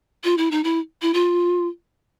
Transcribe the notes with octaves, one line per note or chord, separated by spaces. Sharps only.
F4
E4
D#4
E4
E4
F4